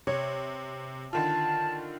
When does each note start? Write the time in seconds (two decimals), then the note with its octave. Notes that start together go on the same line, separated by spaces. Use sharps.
0.07 C3 C#5
1.13 D3 D#3 F4 A5